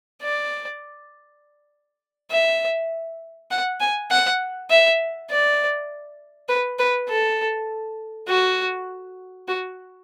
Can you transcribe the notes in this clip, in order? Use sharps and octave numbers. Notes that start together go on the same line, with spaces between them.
D5
E5
F#5
G#5
F#5
E5
D5
B4
B4
A4
F#4
F#4